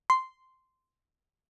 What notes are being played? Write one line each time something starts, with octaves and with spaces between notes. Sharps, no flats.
C6